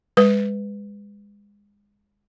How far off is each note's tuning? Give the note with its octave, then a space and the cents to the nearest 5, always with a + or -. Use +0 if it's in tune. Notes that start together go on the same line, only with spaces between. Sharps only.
G#3 -30 B4 +10